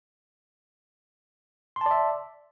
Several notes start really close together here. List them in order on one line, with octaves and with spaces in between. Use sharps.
C6 A5 D5 E5